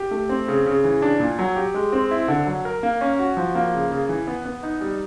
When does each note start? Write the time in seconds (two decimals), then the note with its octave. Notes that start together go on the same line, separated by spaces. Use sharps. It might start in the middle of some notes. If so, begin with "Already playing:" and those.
Already playing: G4
0.11 A3
0.29 C4
0.48 C#3
0.66 C#3
0.84 E3
1.02 D4
1.20 A#2
1.39 F#3
1.56 G4
1.74 G#3
1.93 C4
2.11 E4
2.28 D3
2.47 F#3
2.65 A#4
2.83 A#3
3.01 C#4
3.19 F#4
3.37 F3
3.55 A#3
3.74 C#3
3.91 C#3
4.09 E3
4.28 B3
4.45 B3
4.63 D#4
4.81 G3